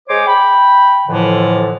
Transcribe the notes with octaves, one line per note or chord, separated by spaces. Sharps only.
G#3 C5 C#5 D6
G5 B5
F2 A2 D3 E3 F3